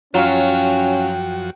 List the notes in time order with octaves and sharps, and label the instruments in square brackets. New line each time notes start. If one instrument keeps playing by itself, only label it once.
[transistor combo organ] F#2 F3 F#4 [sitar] F#3 F4 [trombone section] C#4 [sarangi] G5